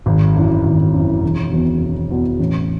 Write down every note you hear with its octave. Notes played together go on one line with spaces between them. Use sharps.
G#1
F#2 E3
G#1
F#2 E3
E1
E2 B2
E1
E2 B2
A1